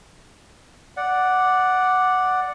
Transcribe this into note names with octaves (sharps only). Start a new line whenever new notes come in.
D5 F#5